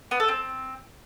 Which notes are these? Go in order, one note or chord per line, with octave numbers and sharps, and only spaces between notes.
B3
A4
C4